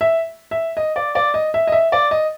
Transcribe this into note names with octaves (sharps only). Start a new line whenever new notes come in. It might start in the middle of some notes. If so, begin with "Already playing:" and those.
E5
E5
D#5
D5
D5
D#5
E5
D#5
E5
D5
D#5